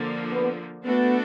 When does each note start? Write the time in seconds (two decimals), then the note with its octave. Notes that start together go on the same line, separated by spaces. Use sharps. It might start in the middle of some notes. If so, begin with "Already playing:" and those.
Already playing: D3 F3 A#3
0.32 B3
0.85 A3 B3 D4 F#4 A4